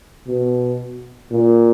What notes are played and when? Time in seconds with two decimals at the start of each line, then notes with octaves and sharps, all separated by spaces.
0.27 B2
1.31 A#2